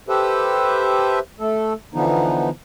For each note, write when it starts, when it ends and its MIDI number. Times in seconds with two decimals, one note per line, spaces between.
0.09 1.19 67
0.09 1.19 69
0.09 1.19 71
0.09 1.19 72
0.09 1.19 76
1.40 1.73 57
1.40 1.73 69
1.94 2.50 50
1.94 2.50 52
1.94 2.50 53
1.94 2.50 59
1.94 2.50 63